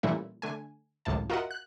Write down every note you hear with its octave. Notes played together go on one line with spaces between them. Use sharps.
A#2 E3 G3 A3 C#4 E4
D3 A3 G#5
G#1 C#2 F#2 A2 E4 A5
F4 F#4 A#4 D#5 E5 F#5
F#6